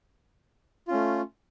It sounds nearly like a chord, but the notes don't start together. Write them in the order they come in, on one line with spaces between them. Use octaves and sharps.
F4 C#4 A3